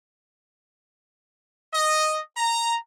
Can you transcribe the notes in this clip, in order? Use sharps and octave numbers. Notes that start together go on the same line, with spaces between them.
D#5
A#5